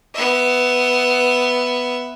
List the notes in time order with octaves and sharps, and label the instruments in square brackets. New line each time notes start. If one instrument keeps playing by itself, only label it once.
[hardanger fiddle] B3 E5